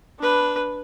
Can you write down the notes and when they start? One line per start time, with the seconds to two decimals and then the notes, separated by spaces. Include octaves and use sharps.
0.20 D4 B4